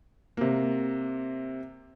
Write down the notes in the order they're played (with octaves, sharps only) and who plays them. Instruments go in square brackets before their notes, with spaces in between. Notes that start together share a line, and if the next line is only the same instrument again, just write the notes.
[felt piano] C3 A#3